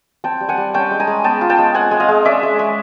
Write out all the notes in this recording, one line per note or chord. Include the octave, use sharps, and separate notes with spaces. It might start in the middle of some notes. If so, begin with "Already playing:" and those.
C4 G5 A5
G3
F#5 G#5
G3
C#4 G5 A5
G#3
G#5 A#5
G#3
B3 G5 A5
F4
G5 A5
G#3
C4 F#5 G#5
G#3
D#5 F5
G#3
C#4 D5 E5
G#3
G#3